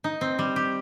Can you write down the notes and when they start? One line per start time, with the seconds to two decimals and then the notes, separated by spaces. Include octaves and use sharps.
0.04 D#4
0.21 C4
0.39 G3
0.56 G4